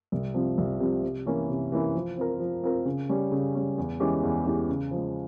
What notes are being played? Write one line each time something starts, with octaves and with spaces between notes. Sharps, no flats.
C2
C3 F3 C4
C2
C3 F3 C4
C3
E3 A#3 C#4 E4
C3
E3 A#3 C#4 E4
F3
C4 F4 A#4
F3
C4 F4 A#4
C#3
G3 C#4
C#3
G3 C#4
E2
E3 G#3 C#4 G4
E2
E3 G#3 C#4 G4
C#3
F3 G#3